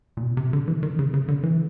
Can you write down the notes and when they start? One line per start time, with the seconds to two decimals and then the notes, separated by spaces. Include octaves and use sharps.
0.17 A#2
0.23 B2
0.37 C3
0.53 D3
0.68 E3
0.83 D#3
0.99 C#3
1.14 C#3
1.28 D3
1.43 E3